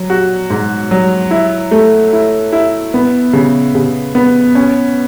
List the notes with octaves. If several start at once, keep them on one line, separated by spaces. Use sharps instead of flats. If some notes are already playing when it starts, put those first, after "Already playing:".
Already playing: F#3
F#4
G#2
F#3
E4
A3
E4
E4
B3
C#3
C#3
B3
C#4